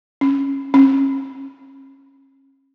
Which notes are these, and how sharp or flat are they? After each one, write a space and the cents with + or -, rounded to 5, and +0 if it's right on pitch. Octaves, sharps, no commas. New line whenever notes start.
C#4 -15
C#4 -35